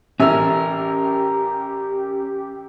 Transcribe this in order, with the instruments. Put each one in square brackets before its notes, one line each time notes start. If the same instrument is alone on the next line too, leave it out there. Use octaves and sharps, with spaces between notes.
[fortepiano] A1 E5 E6 [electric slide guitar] C#4 A#4 [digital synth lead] G4